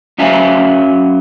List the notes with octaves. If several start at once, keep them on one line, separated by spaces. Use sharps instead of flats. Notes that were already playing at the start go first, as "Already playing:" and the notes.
F#2 F#3 E5 F5 G#5